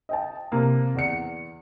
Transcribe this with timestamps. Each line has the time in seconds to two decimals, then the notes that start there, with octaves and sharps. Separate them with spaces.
0.09 D#5 G5 A5
0.52 C3 A#3
0.95 E2 D5 C#7